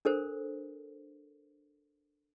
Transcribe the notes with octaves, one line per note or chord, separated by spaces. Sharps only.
D4 A4 A#4 C5